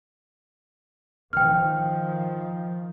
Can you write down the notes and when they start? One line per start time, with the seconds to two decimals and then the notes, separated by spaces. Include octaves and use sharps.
1.33 D#3 F3 G5 F6